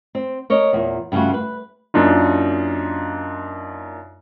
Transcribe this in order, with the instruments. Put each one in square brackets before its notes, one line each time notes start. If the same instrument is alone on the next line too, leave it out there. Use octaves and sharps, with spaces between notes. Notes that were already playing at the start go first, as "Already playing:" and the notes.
[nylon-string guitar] C4
A#4 C#5 D#5
E2 A#2 A#4
G2 C#3 A3 F4 F#4
B4
[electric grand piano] F#2 A#3 D4 D#4 F4